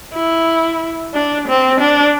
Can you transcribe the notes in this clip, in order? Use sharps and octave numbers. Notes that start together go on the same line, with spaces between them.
E4
D4
C4
D4